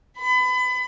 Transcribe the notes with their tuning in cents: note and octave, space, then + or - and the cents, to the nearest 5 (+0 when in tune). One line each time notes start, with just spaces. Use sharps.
B5 +30